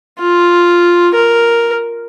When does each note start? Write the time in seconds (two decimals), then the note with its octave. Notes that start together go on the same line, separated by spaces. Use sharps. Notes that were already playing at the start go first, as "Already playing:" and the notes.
0.20 F4
1.14 A#4